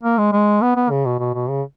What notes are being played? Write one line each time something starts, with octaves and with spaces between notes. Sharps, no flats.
A#3
G#3
G#3
B3
B3
C#3
B2
B2
B2
C#3